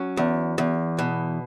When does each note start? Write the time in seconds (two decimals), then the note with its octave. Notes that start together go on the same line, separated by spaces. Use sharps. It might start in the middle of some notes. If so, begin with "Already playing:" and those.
Already playing: F#3 C#4
0.17 E2
0.58 E2
0.99 B2